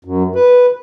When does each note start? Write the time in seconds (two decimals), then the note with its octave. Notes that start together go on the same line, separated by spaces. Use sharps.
0.05 F#2
0.35 B4